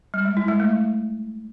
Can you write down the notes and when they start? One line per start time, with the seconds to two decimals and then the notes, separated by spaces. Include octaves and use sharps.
0.14 G3
0.25 G#3
0.37 E4
0.48 G#3
0.60 A3